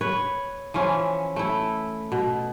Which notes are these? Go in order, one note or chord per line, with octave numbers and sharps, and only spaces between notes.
B4 C#5
E3 F3 C#4
A3 E4
B2